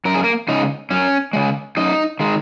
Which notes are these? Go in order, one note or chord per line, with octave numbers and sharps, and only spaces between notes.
F#2 A#4
G#4
A#3 A#4
C#3 G#3 D#4
F#2 C#4
C#3 G#3
F#2 D#4
D#3 G#3